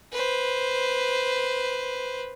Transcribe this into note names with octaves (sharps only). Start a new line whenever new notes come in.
B4 C5